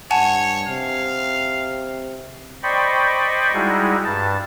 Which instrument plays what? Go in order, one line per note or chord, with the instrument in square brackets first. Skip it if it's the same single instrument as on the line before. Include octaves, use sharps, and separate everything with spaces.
[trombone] G2 [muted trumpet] C#5 [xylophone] F#5 G#5 A5
[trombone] C3 [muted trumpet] F5
[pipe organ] C5 D5 D#5 G5 B5 C#6
G3 G#3 D#4 E4 F#4 G#4
G2 A5